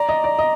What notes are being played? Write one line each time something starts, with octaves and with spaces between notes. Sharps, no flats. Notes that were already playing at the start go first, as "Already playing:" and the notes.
Already playing: D5 A#5
D#5
D5
D#5